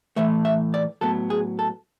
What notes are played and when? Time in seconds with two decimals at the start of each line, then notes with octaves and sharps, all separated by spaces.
0.16 A2 E3 A3 E5
0.45 E5
0.74 D5
1.01 A2 F#3 B3 A4
1.30 G#4
1.59 A4